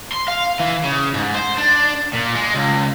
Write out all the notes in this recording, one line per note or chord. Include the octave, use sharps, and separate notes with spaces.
C6
F5
E3
C#3
G#2
C5
D4
A#2
G#3
C#2